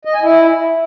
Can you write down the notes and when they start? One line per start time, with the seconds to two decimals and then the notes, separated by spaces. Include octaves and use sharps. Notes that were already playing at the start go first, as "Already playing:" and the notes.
0.05 D#5
0.14 G#5
0.23 E4